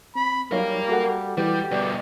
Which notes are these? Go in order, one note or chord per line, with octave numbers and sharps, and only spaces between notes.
C4 B5
F#3 G3 D#4 A#4 C#5 F5
F#4 A4 F#5
E3 G3 E4 G4 B4
B2 G3 B4 D5